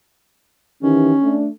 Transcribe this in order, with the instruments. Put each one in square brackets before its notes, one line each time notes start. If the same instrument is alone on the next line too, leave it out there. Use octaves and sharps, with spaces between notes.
[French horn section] D#3 E3 G4 [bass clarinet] C#4
[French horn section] A3 D4